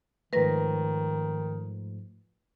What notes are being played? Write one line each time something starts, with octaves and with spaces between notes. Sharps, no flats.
G#2 D#3 F3 A3 B4 A#6